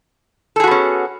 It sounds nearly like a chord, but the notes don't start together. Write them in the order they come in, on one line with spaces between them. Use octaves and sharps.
A4 G#4 F#4 B3 C#4